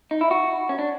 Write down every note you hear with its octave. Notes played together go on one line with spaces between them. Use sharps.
D#4
E4
F#4
C#4
D4